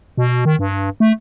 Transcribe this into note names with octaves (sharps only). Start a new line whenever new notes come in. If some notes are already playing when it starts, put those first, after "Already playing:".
B2
D#3
G2
A3